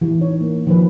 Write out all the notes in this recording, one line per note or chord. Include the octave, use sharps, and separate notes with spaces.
E3
D#4 C#5
A#3
D#3 F3 B4